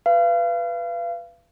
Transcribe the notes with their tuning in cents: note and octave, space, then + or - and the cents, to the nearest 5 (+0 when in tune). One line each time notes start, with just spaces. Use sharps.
B4 +0 F5 -35